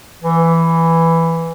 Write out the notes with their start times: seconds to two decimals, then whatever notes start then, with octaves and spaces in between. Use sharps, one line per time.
0.23 E3